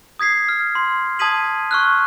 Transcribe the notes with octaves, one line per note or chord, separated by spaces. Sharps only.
D#6 G#6 B6 C7
F6
C6
A5 D#6 G#6 B6 D#7 F#7
C#6 F6 F#6